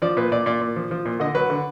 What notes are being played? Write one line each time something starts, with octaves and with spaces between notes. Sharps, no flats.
F3 D5
A#2 B4
A#2 D5
A#2 D5
A#2
F3
F3
A#2
D3 D#5
F#3 B4
D3